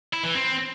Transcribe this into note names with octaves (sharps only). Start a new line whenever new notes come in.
E4
E3
C4